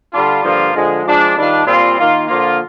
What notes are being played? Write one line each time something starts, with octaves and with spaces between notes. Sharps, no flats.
D3 G3 D4 F4
G2 D3 F3 A#3 F4
D3 F3 G#3
F3 G#3 D4 F4
D#3 G3 D4 F4
A#2 G3 C4 F4
D#3 A#3 F4
D3 F3 A#3 F4